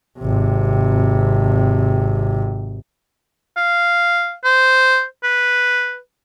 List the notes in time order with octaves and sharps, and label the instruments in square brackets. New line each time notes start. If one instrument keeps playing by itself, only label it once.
[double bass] G#1 C3
[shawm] F5
C5
B4